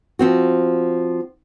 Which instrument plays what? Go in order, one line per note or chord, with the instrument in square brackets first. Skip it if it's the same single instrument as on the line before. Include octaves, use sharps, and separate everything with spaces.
[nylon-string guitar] F3 C4 F#4